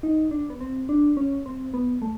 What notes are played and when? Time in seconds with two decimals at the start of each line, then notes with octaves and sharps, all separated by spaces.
0.03 D#4
0.31 D4
0.50 B3
0.61 C4
0.89 D4
1.17 C#4
1.46 C4
1.74 B3
2.02 A3